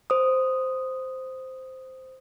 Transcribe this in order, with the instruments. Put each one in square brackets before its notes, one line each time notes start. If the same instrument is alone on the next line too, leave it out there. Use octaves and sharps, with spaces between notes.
[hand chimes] C5 D#6